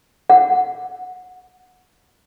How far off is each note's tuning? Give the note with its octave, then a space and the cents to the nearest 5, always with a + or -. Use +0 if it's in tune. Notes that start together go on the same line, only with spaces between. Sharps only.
F#5 -15